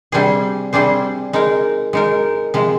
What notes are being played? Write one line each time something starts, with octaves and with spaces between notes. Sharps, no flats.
C3 G3 D4 G#4 C5
C3 G3 D4 G#4 C5
G#3 D#4 A#4
G#3 D#4 A#4
C3 F3 G#3